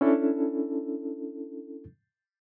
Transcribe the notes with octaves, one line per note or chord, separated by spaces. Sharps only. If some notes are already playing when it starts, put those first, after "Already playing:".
C#4 D4 E4 A4